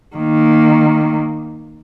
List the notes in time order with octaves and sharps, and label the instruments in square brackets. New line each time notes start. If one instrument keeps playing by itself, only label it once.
[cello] D#3 A#3